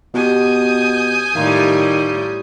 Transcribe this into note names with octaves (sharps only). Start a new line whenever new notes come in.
B2 F#4 G4 G#5 D#6 G6
A2 D#3 G3 F5 A#5 C6